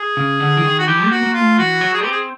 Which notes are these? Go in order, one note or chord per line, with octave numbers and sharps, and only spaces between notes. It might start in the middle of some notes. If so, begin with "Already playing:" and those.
Already playing: G#4
C#3
D3
E3
D#3
F#4
E3 G4
A#3
F#4
A#3
F4
A3
E3 F#4
F#3
G#4
C4 G4
G#4